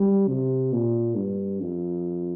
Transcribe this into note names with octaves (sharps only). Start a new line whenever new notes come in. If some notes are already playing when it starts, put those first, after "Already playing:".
Already playing: G3
C3
A#2
G2
F2